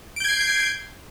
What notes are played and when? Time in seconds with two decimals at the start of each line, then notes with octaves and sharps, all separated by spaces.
0.16 D7
0.20 G6
0.24 G#6
0.28 C7